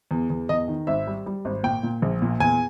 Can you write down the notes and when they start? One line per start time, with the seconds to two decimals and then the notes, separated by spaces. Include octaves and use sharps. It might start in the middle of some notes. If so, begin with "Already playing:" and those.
0.11 E2
0.30 E2
0.49 E2 D#5
0.68 D#3
0.87 G#1 E5
1.07 G3
1.26 G3
1.45 G#1
1.63 A#2 G5
1.83 A#2
2.02 A#1
2.22 A#2
2.40 E2 G#5